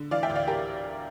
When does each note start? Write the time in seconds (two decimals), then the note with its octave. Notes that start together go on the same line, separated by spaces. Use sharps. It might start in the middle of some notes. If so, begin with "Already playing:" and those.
Already playing: D3
0.11 E3 D5 F5
0.23 E5 G5
0.30 D2
0.35 D5 F5
0.47 G4 A#4